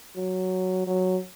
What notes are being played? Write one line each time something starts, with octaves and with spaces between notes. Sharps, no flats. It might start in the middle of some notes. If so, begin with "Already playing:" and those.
F#3
F#3